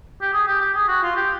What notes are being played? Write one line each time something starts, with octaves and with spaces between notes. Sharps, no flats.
G4
G#4
G4
G4
G#4
F#4
F4
G4